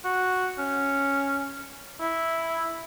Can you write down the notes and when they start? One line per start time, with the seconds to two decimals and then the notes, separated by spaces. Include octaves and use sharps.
0.05 F#4
0.59 C#4
2.01 E4